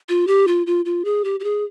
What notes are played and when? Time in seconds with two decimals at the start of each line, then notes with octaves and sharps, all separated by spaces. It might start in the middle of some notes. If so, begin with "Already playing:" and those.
0.09 F4
0.27 G4
0.47 F4
0.67 F4
0.85 F4
1.05 G#4
1.24 G4
1.40 G4
1.44 G#4